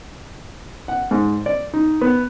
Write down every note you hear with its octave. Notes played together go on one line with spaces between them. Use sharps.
F#5
G#2
D5
D#4
B3